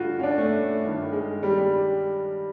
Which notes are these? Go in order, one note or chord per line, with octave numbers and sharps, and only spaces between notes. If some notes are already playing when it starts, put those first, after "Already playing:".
Already playing: G2 D3 F4 F#4
C#4
D4
A3
G2 D#3
G#3
G3
G3